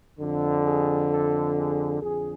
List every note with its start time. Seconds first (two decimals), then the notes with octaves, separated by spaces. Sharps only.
0.19 F2 D3
0.65 G#4
1.10 A4
1.56 G#4
2.01 F2 D3 G#4